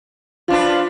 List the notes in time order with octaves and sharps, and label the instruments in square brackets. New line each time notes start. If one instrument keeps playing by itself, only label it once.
[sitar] F3 D4 B4 [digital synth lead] F4